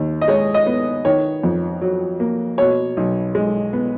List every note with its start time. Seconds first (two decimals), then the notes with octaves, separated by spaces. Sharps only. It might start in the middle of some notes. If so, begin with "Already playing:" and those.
Already playing: D#2
0.21 D#5
0.28 G#3 C#5
0.54 D#5
0.66 B3
1.05 D#3 C#5
1.43 F2
1.81 F#3
2.20 A#3
2.58 B2 C#5
2.97 B1
3.35 G#3
3.73 B3